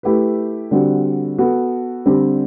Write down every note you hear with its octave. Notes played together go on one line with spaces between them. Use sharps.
A3 E4 G4 B4
D3 G3 C4 F#4
B3 F#4 A4
D3 G3 C4 G4